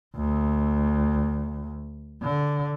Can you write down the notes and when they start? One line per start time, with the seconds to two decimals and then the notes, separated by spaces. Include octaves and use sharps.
0.16 D2
2.22 D3